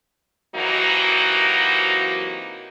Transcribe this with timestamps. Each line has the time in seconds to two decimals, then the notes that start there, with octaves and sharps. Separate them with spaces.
0.56 C3 E3 F#3 A#3 D#4 F#4